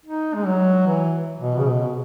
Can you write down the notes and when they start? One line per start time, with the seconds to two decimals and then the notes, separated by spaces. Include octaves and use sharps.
0.06 D#4
0.34 G#3
0.46 F#3
0.87 E3
1.41 B2
1.58 C#3
1.67 B2